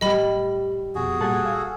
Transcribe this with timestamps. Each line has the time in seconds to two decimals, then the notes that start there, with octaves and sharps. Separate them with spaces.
0.01 A2 G3 G4 D#5 B5
0.95 F2 B2 F#4 G#4
1.20 A#2 G3 A4 F#5 G#5
1.42 F5 E6